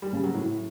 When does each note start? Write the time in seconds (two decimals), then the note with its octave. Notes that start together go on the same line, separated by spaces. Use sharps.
0.02 G3
0.13 C#3
0.24 F#3
0.34 A2